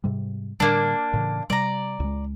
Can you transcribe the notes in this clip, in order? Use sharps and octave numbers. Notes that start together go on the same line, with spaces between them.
G#2 C3 G3
A2 D3 G3 A#3 D4
A2 C#3 E3
C3 G3 D5 A#5
C#2 G#3